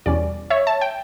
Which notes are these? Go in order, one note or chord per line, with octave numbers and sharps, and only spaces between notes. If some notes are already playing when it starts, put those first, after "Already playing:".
E2 B2 G3 C#4 D5
C#5 E5
A5
G5